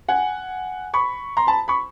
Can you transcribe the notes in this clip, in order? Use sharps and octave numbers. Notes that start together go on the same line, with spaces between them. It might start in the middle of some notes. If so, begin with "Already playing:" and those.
F#5 G#5
B5 C#6
A#5 C6
A5 B5
B5 C#6